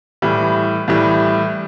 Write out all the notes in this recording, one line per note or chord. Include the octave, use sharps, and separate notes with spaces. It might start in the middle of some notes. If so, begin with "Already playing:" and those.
A2 E3 G3
A2 E3 G3